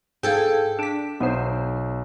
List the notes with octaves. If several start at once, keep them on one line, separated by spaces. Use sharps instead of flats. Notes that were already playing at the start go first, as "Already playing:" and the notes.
G#2 G#4 A4 F5 G5 G#6
D4 B6 D7 E7
B1 B3 D#4 C5 E5